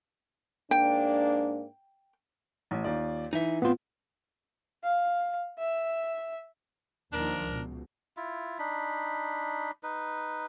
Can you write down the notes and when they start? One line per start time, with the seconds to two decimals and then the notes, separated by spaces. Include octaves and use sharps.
0.71 G#2 A#3 D4 G5
2.71 A1
2.84 D#2 F4 D5
3.33 E3 D#4 E5
3.62 A2 B3 C4 F4
4.84 F5
5.59 E5
7.13 D#2 D#3 F3 D4 A#4
7.45 C#2 B2
8.17 E4 F4
8.59 D4 D#4 B5
9.83 D#4 B4